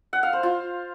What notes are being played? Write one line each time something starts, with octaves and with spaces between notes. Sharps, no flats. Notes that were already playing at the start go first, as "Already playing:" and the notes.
F#5
F5
C5
F4